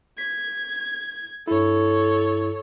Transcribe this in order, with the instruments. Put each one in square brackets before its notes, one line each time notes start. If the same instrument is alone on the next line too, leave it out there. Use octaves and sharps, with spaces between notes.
[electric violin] G#6 [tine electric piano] B6
[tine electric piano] G2 E4 [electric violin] A4 C#5